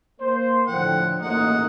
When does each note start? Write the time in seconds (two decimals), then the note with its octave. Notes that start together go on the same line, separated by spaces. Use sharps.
0.20 A#3 C5
0.67 A2 D3 F3 F#5 G5
1.22 A1 F#2 G#3 A#3 D#4 F#5